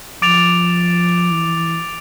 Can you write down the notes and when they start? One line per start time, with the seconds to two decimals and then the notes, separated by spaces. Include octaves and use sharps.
0.22 F3 D6 A6 D7 F7
1.31 E3